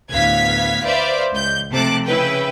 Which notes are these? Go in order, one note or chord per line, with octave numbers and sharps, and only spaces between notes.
D2 A2 B3 F5 G#6 B6
B4 C5 D5 E5 F5
C#2 G6
C3 F3 A3 A5 D6 F#6
C#3 E4 B4 G5